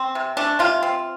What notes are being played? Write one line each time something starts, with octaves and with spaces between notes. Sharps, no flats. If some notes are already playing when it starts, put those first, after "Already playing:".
Already playing: C4
C3
A3 D4
C3 F4
C4